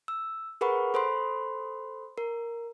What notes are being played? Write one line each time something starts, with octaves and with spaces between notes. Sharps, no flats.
E6
G#4 A#4 B4 F#5 B5 C#6
A4 C5 B5 C6
A#4